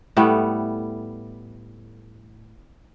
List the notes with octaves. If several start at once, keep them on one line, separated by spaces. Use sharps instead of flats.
A2 G3 A3 B3